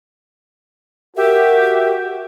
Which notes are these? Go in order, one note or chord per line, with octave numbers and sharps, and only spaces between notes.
F#4 G4 A#4 E5